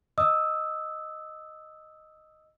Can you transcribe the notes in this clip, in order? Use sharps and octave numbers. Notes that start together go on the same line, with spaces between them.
D#5 D#6 E6